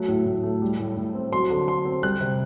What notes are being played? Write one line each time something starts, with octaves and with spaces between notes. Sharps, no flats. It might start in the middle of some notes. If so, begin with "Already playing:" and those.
Already playing: F#3 A3
A2
A2
A3
G3
A2
A2
C4
F#3 C6
D3
D3 C6
C4
G3 F#6
C3